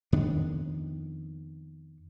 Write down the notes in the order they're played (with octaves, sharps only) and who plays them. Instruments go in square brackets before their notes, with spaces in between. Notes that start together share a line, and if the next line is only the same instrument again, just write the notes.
[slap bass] F2 D#3 B3 D4